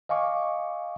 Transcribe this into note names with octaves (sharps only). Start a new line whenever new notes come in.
D#5 F5 G#5 C#6 D6